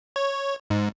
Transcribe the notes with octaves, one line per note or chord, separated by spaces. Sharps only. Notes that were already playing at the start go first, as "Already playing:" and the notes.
C#5
G#2